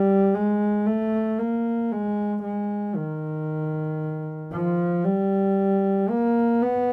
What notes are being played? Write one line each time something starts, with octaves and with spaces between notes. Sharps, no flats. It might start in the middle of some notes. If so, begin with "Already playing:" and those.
Already playing: G3
G#3
A3
A#3
G#3
G#3
D#3
F3
G3
A#3
B3